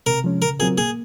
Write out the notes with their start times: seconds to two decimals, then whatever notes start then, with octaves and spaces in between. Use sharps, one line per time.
0.06 C3 A#4
0.24 F3 G#3 C#4
0.42 C#3 A#4
0.59 F#3 C4 F4 G#4 A#4
0.77 A#3 G#4